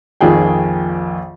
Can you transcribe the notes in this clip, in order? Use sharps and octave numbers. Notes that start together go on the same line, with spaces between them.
A#1 F2 D#3 G#4 G5